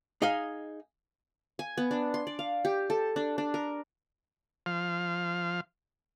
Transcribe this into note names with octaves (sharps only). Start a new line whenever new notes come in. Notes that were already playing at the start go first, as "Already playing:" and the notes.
D#4 G#4 D#5 F5
G#5
B3
D4
C6
D5
F5
G4
A4
D4
D4
A#4
F3 F5